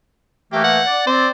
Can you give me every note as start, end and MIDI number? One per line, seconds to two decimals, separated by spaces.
0.52 0.79 52
0.52 0.79 57
0.52 0.79 58
0.52 0.60 67
0.64 1.02 78
0.86 1.05 74
1.07 1.27 60
1.07 1.30 72
1.07 1.27 74